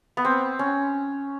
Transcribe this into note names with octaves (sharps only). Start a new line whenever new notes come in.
B3
C4
C#4